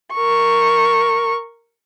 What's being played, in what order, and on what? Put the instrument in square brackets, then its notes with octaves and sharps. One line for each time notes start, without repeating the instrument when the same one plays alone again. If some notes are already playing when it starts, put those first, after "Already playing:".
[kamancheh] A#4 C#6